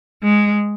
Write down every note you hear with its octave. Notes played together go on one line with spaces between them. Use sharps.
G#3